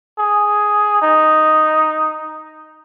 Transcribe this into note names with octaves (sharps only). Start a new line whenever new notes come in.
G#4
D#4